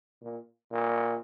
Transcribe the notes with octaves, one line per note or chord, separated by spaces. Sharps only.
A#2
A#2